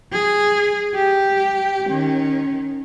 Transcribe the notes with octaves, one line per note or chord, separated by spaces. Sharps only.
G#4
G4
D#3 C#4